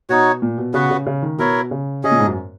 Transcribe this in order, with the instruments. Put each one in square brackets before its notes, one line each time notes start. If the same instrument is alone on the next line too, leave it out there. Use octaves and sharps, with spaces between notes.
[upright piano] B2 [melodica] D#4 F#4 C#5
[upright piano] A#2
B2
[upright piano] C#3 [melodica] B3 F#4 B4
[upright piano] C#3
C#3
D#3
[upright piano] B2 [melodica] E4 A#4 C#5
[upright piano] C#3
[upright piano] C#3 [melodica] C#4 G#4 D#5
[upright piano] A#2
G#2
F#2